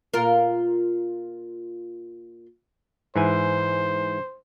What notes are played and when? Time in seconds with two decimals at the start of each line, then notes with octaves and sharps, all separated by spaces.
0.14 A#2 F4 A#4
3.16 G#2 E3 C5 G#5